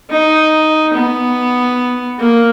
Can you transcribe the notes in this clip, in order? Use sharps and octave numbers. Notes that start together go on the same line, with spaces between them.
D#4
B3
A#3